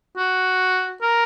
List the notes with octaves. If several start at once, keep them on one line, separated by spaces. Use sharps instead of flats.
F#4
A#4